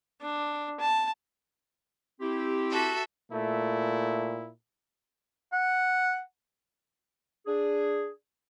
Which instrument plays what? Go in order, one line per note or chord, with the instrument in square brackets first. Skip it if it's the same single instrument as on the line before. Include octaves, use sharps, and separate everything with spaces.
[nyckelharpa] D4
A5
[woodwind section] C4 E4 G4
[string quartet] F#4 A4 E5
[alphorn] A#2 [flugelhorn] A3 [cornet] E4
[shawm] F#5
[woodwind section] D4 G#4